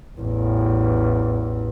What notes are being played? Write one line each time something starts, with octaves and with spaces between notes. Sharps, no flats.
A1 E2